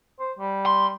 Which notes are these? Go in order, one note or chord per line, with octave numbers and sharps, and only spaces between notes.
C5
G3
C6